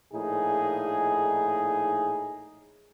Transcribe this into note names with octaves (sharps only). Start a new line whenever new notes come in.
A#1 A2 D#4 G#4